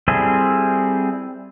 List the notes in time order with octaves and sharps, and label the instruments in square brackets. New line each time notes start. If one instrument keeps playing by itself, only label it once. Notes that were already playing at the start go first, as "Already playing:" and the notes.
[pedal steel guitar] G3 C4 E4 G#4 A4